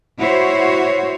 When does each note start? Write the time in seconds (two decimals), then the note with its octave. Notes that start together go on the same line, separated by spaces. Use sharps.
0.19 E4 F#4 C5 C#5